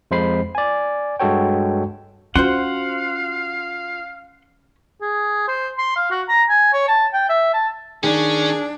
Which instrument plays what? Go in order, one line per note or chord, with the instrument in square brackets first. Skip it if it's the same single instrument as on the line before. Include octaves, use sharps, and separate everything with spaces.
[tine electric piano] F2 G#3 C5 B5 C7
D5 G#5
G2 G#3 F#4 A4 C#5 G5
[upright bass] C#4 [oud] F4 F#4 C5 [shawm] F5 [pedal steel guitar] F#5 C6
[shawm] G#4
C5
C6
F5
F#4
A#5
G#5
C#5
A5
G5
E5
A5
[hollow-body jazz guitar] D#3 [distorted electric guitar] C#4 [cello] D4 [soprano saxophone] G#4